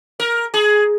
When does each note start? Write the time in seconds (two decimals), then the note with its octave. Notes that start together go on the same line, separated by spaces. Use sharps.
0.20 A#4
0.54 G#4